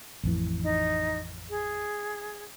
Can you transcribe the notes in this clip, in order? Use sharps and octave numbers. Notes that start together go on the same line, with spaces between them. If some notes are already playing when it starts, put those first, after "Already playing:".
A1 F2 E3
D#4
G#4